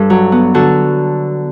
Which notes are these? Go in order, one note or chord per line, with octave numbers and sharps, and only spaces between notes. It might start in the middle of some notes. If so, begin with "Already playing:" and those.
Already playing: G2 A4
F#3
B3
D3 F#4 A4